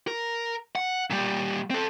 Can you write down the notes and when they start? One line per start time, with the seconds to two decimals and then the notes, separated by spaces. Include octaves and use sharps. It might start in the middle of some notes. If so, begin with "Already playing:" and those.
0.08 A#4
0.75 F#5
1.10 A#2 G3
1.70 C4 A4